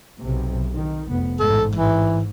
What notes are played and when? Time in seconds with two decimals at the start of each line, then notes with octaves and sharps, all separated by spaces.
0.20 B1 C3
0.74 D#3
1.08 F1 B3
1.39 A1 G#2 A4
1.75 G#2 E3